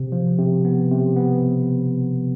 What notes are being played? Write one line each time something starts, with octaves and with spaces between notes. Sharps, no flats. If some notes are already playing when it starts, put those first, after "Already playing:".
Already playing: C3
F3
C3
B3
C3
B3